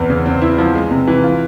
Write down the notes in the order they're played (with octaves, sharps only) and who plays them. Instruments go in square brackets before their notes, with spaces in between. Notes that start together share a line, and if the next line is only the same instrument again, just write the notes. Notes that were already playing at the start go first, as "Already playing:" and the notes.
Already playing: [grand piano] E2 E3 C4
C#3
C4
E4
F3
G#3
C3
E3
F4